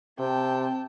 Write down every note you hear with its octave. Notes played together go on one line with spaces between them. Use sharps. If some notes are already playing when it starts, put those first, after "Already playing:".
C3 C4 G5 A5